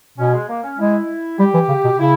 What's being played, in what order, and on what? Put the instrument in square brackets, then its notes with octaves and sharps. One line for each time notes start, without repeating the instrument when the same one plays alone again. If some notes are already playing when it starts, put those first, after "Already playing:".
[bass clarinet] B2 [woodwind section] C#4
[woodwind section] G#3
A#3
C#4
[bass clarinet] G#3 [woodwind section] E4
[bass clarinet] G3 [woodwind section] G4
[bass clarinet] E3
C#3
B2
[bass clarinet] C#3 [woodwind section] E4